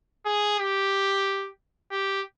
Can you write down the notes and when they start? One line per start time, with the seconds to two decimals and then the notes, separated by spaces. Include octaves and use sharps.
0.25 G#4
0.59 G4
1.91 G4